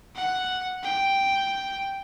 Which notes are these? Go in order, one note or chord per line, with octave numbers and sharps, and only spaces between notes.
F#5
G5